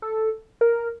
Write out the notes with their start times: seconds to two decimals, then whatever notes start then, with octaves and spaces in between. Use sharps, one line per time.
0.02 A4
0.61 A#4